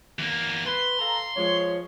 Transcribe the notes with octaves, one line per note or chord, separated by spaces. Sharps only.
E2 A#3
B4 C6
A4 F5 A#5
F3 G#3 C#5